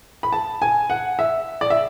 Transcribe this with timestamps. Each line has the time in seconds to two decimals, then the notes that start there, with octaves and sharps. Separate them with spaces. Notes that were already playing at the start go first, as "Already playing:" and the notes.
0.23 B5
0.33 A5
0.62 G#5
0.90 F#5
1.19 E5
1.61 D5
1.70 E5